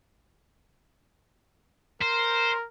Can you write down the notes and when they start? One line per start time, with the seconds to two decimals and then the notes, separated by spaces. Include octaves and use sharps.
2.02 A#4 C5